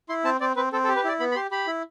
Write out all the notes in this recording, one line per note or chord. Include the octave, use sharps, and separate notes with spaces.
E4 C6
C4 A5
C4 D5
C4 B4
C4 A4
A4
G4
B4
E4 D5
B3 B5
B5
G4 C6
G4 B5
E4